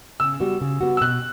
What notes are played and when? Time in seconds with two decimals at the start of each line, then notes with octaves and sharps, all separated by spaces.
0.20 C#3 E6
0.40 G3 B3 F#4
0.61 C#3
0.81 G3 B3 F#4
0.97 E6
1.01 B2 F#6